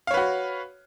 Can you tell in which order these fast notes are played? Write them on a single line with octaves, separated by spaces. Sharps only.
F5 C#5 B4 F#4